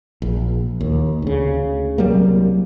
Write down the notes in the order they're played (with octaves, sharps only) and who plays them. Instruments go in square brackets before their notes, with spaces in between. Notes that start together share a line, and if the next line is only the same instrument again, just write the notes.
[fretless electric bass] A#1
D#2
D2 C#3
C2 F#3 G3 A#3